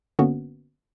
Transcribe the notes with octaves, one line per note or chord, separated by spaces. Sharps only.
G1 D3 A#3 B3 C#4 F#4